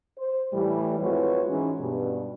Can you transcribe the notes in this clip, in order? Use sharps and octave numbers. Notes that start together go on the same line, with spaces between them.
C5
A2 E3 G3
F2 G#3 E4 F#4 B4 C#5
G#2 E3 C#4
G2 B2